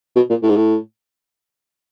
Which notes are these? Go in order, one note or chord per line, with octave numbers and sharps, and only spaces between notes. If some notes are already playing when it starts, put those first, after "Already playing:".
B2
A#2
A2
G#2
A2